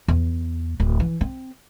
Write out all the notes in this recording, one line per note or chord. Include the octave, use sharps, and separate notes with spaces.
E2
D1
E3
C4